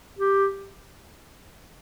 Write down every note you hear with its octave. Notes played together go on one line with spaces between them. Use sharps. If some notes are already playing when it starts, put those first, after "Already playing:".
G4